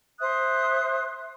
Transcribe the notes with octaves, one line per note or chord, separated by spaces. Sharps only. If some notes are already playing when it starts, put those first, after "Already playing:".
C5 E5 D#6 F#6